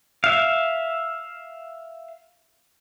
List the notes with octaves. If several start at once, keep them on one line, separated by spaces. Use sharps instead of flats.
E5 F5